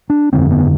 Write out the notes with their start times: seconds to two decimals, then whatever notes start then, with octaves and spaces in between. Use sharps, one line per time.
0.10 D4
0.33 G1 F2 D3 C4
0.50 B3